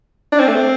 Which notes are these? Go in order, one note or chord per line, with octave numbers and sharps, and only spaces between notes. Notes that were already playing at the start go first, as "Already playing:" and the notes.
D4
C4
A3
C4